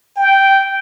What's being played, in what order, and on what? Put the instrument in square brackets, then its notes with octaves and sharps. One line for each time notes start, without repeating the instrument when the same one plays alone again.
[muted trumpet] G5